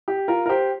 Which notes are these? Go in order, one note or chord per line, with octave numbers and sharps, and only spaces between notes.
G4
F4 A#4
A#4
G4 C5